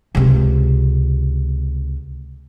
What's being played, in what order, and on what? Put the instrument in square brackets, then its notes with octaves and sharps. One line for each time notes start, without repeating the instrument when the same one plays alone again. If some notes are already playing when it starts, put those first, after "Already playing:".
[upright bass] C#2 C3